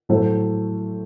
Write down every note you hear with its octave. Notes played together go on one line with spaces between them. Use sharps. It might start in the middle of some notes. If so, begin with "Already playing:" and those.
A2 F#3 A3 A4 C5